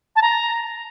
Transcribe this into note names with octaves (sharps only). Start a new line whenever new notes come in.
A5
A#5